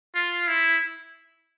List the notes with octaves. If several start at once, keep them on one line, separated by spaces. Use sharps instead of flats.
F4
E4